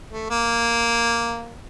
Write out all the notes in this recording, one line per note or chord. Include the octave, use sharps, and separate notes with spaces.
A3
A#3